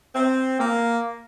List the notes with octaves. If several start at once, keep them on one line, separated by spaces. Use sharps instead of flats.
C4
A#3